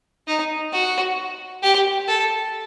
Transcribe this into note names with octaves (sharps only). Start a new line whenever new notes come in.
D#4
F#4
G4
A4